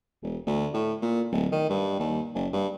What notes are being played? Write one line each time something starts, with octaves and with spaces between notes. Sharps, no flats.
E1
D2
A2
A#2
D1
D#3
G2
D#2
F#1
G2